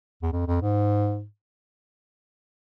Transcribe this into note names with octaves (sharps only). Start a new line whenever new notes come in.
E2
F2
F2
G#2